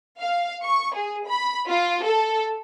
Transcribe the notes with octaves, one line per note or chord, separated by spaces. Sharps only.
F5
C#6
G#4
B5
F4
A4